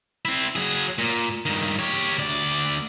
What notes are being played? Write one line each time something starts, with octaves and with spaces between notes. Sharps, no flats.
C4 E4
F#3 G#4
A#2
G2 D#3
G4 C#5
D2 D5